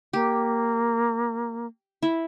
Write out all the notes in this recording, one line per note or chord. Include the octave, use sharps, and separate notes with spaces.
A#3 G4
E4